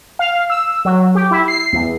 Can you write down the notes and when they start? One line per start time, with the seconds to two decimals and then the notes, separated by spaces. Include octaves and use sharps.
0.19 F5
0.50 E6
0.85 F#3
1.15 G4
1.31 E4
1.48 C7
1.73 E2